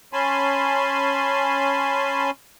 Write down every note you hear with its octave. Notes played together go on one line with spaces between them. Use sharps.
C#4 G#5 A5 B5 C6